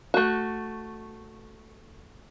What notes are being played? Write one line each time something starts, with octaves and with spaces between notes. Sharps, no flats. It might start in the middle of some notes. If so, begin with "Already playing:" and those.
A3 F#4